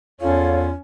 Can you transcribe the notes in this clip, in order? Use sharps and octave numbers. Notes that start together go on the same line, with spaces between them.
E2 C#4 F4 A4 C#5 F5